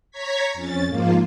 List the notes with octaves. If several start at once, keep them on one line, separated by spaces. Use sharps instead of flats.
C#5 A#5 C#6 G#6 B6
F2 C#4 A6
G#2 F3 A#3 F4